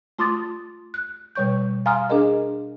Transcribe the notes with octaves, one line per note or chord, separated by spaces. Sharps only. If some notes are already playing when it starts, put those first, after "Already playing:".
A3 F4 C6 D6 D#6 A6
F#6
B2 G3 C#5 C#6 G6
F5 G#5 A#5 C6 D#6 F6
D4 G#4 A#4 D#5